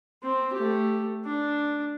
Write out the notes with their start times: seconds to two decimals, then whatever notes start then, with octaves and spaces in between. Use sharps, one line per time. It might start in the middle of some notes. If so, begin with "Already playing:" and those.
0.23 C4
0.53 A3 G4
1.25 D4